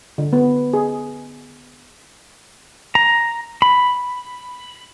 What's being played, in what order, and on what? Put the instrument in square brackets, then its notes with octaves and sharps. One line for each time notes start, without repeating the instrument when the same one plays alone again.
[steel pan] D3
B3
G#4
[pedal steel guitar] A#5
B5